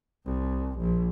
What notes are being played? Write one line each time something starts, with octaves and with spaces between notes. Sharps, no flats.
C2
A#1